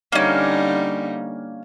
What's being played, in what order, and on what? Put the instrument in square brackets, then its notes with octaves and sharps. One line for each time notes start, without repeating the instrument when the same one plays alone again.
[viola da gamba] D3 G3 D#4 [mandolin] A#3 C#4